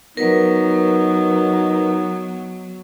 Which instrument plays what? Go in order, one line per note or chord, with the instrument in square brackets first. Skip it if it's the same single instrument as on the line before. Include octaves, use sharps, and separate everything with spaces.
[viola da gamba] F#3 [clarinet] B3 [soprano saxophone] D#4 [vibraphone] A#4 B4